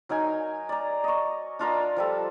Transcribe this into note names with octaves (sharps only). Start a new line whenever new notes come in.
F#3 D#4 A#4 G#5
D5 A#5
D#5 C#6
D4 F4 A#4 D#5
F3 G3 A4